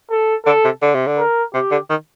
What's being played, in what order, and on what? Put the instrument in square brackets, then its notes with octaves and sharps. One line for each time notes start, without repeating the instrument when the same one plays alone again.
[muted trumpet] A4
[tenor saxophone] D3 [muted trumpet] A4
[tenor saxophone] C3
D3
C3
D3
[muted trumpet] A#4
[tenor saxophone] C3 [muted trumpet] G4
[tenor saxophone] D3
D#3